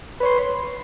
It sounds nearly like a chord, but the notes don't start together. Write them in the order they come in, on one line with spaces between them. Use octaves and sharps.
B4 C#5 C6